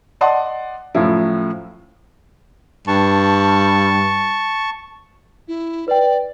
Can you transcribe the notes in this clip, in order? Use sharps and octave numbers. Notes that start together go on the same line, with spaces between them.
D5 D#5 F#5 A5 C6
F#2 A2 F3 E4
G2 A5 C#6
E4
B4 D5 G5